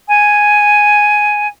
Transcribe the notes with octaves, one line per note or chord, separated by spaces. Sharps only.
G#5